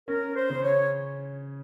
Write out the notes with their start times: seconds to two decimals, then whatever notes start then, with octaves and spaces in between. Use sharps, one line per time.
0.08 C#4 A#4
0.35 C5
0.50 C#3
0.63 C#5